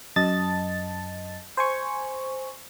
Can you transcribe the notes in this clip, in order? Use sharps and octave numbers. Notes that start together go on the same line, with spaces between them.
F#2 D#5 A5 A6
C5 G#5 C#6